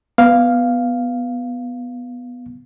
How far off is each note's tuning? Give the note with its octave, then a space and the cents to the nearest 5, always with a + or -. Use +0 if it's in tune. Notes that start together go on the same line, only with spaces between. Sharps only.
B3 +0 F5 +0